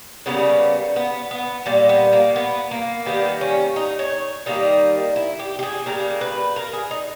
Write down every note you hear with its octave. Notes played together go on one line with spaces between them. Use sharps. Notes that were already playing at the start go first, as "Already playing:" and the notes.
C#3 G3 A#3 B3
B3
B3
A#2 G3 A#3
B3
A#3
B3
A#3
D#3 G3 A#3 B3
C#4
D#4
C#5
D#3 G3 A#3 D#4
E4
G4
G4
G#4
C#3 G3 A#3 A#4
B4
A#4
G#4
D#4